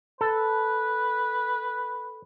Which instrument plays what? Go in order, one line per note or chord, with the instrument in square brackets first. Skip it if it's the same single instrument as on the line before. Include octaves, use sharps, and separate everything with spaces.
[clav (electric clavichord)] A4 [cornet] B4